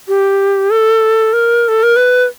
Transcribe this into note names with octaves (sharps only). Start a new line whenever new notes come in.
G4
A4
A#4
A4
A#4
B4